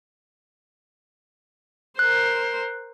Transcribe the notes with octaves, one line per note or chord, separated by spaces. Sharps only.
A#4 C5 F#6